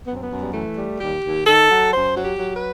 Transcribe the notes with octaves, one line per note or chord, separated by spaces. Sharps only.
F#2 B3
C4
B3
F#2
G3
E3 A3
G3
D#2 G4
D#2
D#3 A4
F#3
F#2 C5
F#3
G4
F#3
B4